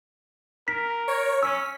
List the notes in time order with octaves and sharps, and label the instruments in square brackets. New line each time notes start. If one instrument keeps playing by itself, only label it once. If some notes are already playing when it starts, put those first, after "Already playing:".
[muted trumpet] A#4 [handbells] B6
[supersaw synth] C#5
[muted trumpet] C#4 [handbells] E6 [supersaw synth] B6